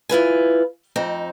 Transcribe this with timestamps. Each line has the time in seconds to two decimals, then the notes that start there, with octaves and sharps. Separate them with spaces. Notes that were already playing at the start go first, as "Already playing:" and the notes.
0.09 E4 F4 B4 G#5
0.96 F2 C4 D#4